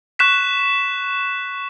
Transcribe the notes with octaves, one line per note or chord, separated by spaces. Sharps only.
C#6 F#6 B6 E7